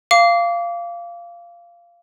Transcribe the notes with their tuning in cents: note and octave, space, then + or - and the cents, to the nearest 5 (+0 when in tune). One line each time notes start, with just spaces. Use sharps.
F5 -15 D6 -30